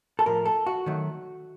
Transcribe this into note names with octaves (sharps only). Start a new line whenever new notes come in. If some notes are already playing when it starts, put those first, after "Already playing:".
A4
A2 F3 A3 A#4
A4
F#4
D#3 F#3 A3